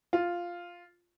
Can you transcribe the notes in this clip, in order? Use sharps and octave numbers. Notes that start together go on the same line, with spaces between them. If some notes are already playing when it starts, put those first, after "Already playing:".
F4